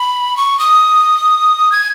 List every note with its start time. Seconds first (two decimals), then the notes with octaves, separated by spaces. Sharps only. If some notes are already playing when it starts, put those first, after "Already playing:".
Already playing: B5
0.37 C#6
0.59 D#6
1.72 G#6